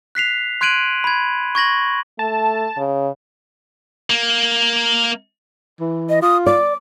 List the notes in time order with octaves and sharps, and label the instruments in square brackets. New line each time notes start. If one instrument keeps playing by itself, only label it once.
[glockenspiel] F#6 B6 C7 F7
C6 F#6 G#6 D7 D#7 F#7
B5 G#6
C#6 G#6 A#6 F#7
[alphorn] A3 [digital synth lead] A5
[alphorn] C#3
[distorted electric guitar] A#3
[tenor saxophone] E3
[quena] D#5
[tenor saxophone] F4 [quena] D#6
[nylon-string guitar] D5 [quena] D6